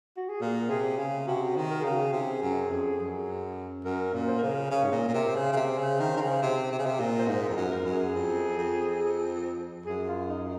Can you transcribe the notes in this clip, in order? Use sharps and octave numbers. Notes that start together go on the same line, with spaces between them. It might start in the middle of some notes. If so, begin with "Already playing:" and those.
F#4
G#4
A#2 A#4
C3 G#4
C#3 G#4
C3 F#4
D#3
A#4
C#3 G#4
F#4
G#4
C3
F#2
F2
F#2
F#2 A#4
A#2
C5
C#3 A#4
G#4
A#4
C#3 C#5
G#2
A#2
A#4
A#2
C3
C5
C#3
C#3
C3
C#3
D#3
D#3
C#3
C3
C3
C#3
C3
A#2
C5
G#2 A#4
F2
F#2
A#4
F#2
G#4
F2
F2
F#2 G#4
F4
D#4